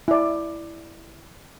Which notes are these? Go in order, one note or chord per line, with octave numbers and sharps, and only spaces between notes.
E4 D5